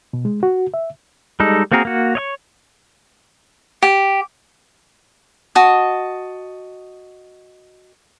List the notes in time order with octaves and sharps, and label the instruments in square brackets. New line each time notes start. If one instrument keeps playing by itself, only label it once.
[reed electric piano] B2
G#3
F#4
E5
[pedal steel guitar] G3 G#3 D#4 A4
A#3 C4 F#4 G#4 A#4
A#3 F#4
C#5 D#5 C#6
[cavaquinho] G4
F#4 D#5 A5 D#6